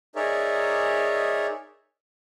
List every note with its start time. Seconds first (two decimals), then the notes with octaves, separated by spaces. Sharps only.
0.16 D#4 G#4 A#4 C#5 D5 E5